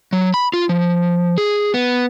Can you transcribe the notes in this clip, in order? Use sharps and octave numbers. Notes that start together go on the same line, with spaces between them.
F#3
B5
F4
F3
G#4
B3